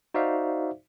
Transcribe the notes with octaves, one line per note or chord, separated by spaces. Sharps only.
D#4 F#4 C5 D5 E5 F5